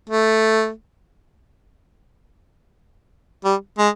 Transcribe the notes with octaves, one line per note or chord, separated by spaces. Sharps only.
A3
G3
G#3